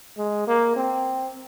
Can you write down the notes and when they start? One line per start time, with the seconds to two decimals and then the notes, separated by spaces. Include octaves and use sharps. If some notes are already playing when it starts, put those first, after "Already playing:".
0.17 G#3
0.47 A#3
0.76 C4